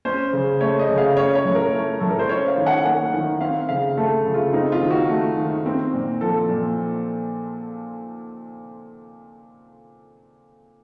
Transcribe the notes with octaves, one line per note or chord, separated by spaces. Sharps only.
C#4 C5
C#3
A3 C#5
D#5
C#3
F5
C#4 C#5
C#5
A2
A#4
A3
A2 A4
A#4
C5
C#4 C#5
F5
D#3
F#5
A#3 F#5
D#3
C4 F5
C#3 F5
A3 A4
C#3
F4
C4 D#4
F4
D#3
F#4
A3
D#3
C4
A#2
F3 A4
A#2